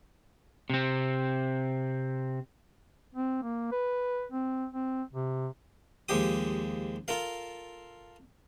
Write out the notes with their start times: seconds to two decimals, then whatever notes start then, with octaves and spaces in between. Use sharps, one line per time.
0.70 C3 C4
3.15 C4
3.42 A#3
3.72 B4
4.32 C4
4.72 C4
5.13 C3
6.09 D#2 F3 G#3 G4 D#6
7.08 F4 A4 A#4 F5